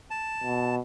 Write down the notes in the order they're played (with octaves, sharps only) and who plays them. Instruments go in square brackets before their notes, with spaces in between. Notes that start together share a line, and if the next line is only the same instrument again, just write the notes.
[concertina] A5
[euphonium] B2